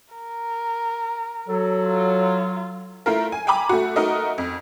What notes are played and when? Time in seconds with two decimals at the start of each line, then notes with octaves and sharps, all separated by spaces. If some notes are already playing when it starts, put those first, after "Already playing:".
0.14 A#4
1.49 F#3 A4
1.86 F4
3.06 A3 E4 F4 A#4
3.32 G#5
3.47 G5 G#5 A#5 B5 D6
3.69 A3 F#4
3.96 A3 D#4 F#4 A#4 D#5
4.38 F2